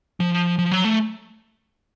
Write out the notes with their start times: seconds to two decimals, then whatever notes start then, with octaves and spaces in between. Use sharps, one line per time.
0.20 F3
0.59 F3
0.71 F#3
0.85 A3